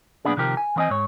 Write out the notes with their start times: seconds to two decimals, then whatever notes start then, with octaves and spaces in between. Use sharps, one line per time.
0.25 B1 A#2 A#3 B3 D4 G#4
0.37 C3 D#3 F3 G4 A#4
0.57 G#5
0.76 E3 B3 C4 D#5 G#5
0.90 G#2 C#5